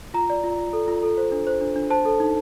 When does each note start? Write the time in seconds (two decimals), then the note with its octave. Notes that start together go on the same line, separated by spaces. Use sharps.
0.14 F4 A#5
0.30 D5
0.44 F4
0.58 F4
0.73 A4
0.88 F4
1.03 A4
1.17 C5
1.32 D4
1.47 C5
1.61 D4
1.76 D4
1.90 C5 A5
2.05 A4
2.20 D#4